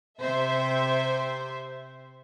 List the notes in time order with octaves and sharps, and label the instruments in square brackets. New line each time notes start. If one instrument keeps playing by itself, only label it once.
[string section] C3 C5 E5